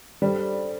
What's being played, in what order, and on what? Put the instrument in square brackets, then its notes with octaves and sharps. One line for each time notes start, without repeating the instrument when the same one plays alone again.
[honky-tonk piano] G3 [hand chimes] D4 A4 C5